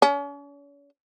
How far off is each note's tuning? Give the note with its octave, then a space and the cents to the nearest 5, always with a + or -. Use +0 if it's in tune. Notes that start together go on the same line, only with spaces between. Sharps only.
C#4 +40